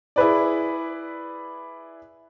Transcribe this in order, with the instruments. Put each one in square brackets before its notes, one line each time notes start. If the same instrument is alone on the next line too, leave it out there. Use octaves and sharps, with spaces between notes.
[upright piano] E4 G#4 B4 D5